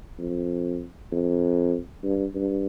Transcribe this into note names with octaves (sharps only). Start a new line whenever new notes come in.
F2
F2
G2
G2